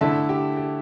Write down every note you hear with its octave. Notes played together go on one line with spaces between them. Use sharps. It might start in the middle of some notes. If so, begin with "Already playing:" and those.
D3 A3 E4 E5 A5
G4
G4